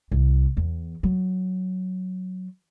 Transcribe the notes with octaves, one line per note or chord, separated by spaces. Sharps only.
C2
E2
F#3